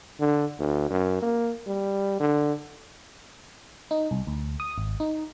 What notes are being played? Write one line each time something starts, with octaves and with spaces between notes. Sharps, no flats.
D3
D2
F#2
A#3
G3
D3
D#4
C2
D2
D#6
G#1
D#4